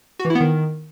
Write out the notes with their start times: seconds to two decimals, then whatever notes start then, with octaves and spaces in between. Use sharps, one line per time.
0.19 F#4
0.25 E3
0.30 E4
0.35 B3
0.40 D#3